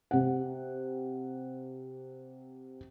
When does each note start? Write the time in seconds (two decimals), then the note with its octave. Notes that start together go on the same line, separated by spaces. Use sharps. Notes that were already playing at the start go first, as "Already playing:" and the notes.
0.11 C3 F#5